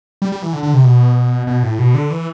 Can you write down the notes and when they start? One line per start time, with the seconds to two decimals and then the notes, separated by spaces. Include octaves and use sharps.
0.22 G3
0.32 G3
0.42 E3
0.53 D3
0.63 D3
0.74 C3
0.84 B2
1.47 B2
1.63 A2
1.79 B2
1.95 D3
2.10 E3